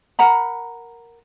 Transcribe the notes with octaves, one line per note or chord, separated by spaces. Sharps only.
A#4 F#5 A#5 B5